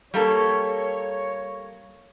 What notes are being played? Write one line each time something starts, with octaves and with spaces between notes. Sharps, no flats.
G3 A#3 A4 C#5